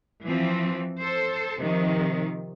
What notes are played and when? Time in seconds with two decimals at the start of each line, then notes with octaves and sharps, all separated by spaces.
0.23 E3 F3 C4
1.01 A4 C5
1.60 C3 D#3 F3